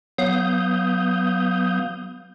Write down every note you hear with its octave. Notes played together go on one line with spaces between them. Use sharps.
F#3 B3 F5 D#6 G6